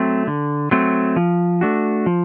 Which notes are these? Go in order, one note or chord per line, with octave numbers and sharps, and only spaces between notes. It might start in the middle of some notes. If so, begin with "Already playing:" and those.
Already playing: F#3 A3 C4
D3
F#3 A3 C4
F3
A3 D4 F#4
F3